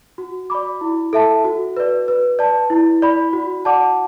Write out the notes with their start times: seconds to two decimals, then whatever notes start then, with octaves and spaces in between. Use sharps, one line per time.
0.18 F#4
0.50 D5 B5 D6
0.81 E4
1.13 A4 E5 A5
1.45 F#4
1.77 B4 D5
2.08 B4
2.39 D5 A5
2.70 E4
3.02 D5 B5
3.33 F#4
3.65 D5 F#5 A5 D6